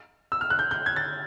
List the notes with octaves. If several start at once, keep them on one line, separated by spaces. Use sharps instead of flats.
E6
F6
F#6
G6
G6
G#6
A6